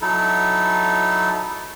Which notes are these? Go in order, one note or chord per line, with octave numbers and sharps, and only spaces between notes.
F#3 D#4 E4 A4